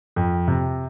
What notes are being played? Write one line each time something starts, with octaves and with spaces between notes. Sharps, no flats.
F2
C3